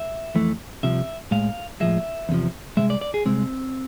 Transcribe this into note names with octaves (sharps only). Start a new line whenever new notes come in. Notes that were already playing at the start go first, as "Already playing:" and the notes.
Already playing: E5
F2 E3 A3
C2 C3 F3 E5
A2 G#3 F5
A2 F3 G#3 E5
E2 C3 F3
C2 C3 G#3 E5
D5
D5
G#4
C2 B2 G#3 C4